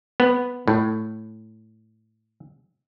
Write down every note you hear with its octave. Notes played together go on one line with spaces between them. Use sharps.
B3
A2